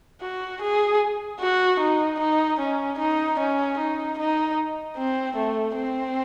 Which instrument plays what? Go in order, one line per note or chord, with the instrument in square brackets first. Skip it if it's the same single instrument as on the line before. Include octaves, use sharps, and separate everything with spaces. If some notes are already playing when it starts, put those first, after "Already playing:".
[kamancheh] F#4
G#4
F#4
D#4
D#4
C#4
D#4
C#4
D#4
D#4
C4
A3
C4